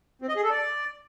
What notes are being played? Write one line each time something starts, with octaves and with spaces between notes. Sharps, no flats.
C4
D#5
G#4
A4
D5